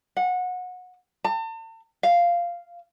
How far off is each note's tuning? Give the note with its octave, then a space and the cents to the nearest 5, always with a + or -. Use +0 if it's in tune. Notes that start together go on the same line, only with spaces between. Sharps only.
F#5 -25
A5 +40
F5 -5